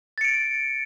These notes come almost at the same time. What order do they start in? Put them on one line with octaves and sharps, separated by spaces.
A6 C#7 D7